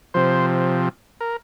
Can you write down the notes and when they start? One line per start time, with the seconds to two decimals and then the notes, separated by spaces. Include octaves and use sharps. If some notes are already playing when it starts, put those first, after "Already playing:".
0.14 C3 F3 C5
1.21 A#4